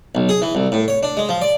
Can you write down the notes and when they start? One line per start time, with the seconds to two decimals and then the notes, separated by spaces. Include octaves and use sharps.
0.15 B1
0.29 G#4
0.42 E3
0.55 C2
0.72 A2
0.88 C#5
1.03 D4
1.17 G#3
1.29 F3
1.42 D5